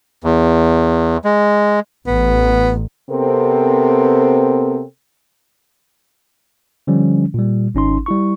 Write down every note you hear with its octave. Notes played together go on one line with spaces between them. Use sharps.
E2
G#3
A1 B3
C3 B3 C4 A4 A#4
D3 F3 G3 C#4
A#2 G3
G#1 C#4 D#4 C6
G3 E4 C#6